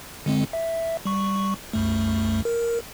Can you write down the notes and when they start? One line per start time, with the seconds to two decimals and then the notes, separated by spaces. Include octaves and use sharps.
0.26 D3 G#3 C4
0.53 E5
1.05 G3 C#6
1.73 C2 F#2 A3
2.45 A#4